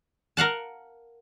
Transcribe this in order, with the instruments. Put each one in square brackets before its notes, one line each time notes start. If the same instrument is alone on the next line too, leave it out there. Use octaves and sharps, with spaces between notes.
[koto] A#4 F5 F#5 A5